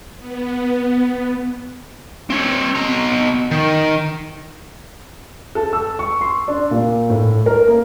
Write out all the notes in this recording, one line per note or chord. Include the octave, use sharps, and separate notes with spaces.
B3
C4 C#5
B2 A#5
D#3
A4
E6
C#6
C6
D4
A#2
A2
A#4
A#3